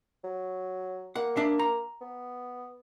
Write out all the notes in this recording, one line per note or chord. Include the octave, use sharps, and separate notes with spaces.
F#3
A#3 F#5
D4 E5
A#5
B3